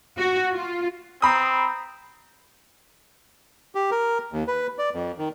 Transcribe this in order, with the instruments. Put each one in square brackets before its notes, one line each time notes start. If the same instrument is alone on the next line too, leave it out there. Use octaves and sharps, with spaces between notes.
[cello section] F#4
F4
[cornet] C4 [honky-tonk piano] A#5 B5 D#6
[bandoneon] G4
A#4
D#2
B4
D5
F2
D#3